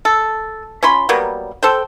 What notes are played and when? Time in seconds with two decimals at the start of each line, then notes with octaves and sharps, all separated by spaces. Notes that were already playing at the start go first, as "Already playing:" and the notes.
0.05 A4
0.83 C#4 F4 B5 C6
1.09 F#3 G3 A#3 B3
1.63 A4 C5 G5